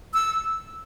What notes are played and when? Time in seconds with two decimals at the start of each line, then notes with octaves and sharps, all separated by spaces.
0.14 E6